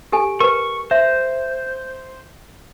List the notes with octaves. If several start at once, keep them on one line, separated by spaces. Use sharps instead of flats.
G4 A4 G#5
A#4 B4 C#6
C5 E5